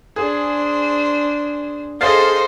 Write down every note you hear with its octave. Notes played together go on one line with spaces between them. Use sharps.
D4 G#4 C5
G#4 A4 C5 D#5 F5 A6 C7